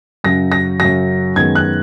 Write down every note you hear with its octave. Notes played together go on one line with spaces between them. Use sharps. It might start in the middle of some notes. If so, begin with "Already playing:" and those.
F#2 C#3 F#3 A#6
A#6
F#2 C#3 F#3 A#6
F#2 D#3 G#3 B3 G#6
F#6